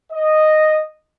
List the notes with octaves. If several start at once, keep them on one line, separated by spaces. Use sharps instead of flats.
D#5